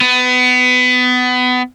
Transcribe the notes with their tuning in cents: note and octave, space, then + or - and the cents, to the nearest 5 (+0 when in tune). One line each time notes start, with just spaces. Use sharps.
B3 +25